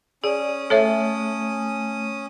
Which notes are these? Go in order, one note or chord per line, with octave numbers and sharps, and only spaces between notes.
C#4 G#4 D5 D#6
A3 A4 C#5 E5